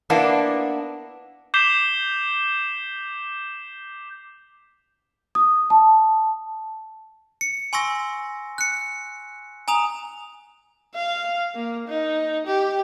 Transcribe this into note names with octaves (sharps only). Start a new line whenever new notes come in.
A#3 B3 D4 E4
D6 G6 B6 C7 E7 G7
D#6
A5
C#7
G#5 C6 C#6 E6 A#6
F#6 C#7
G#5 A#5 D#6 F7
F5
A#3
D#4
G4